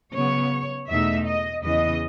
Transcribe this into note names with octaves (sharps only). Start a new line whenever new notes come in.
C#3 F#3 B3 C#5
E2 B2 A3 D#4 E5
D#5
E2 C#3 E3 D#5